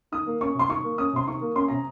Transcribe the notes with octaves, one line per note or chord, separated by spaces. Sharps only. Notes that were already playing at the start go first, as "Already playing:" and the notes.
D#3 D#6
A#3
C#4 C#6
C3 C6
D#3 C#6
A#3
C#4 D#6
C3 C6
D#3 C#6
A#3
C#4 C6
C3 A#5